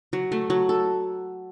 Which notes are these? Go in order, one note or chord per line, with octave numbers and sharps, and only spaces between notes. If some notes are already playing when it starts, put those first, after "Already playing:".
F#3
A3
F#3
A4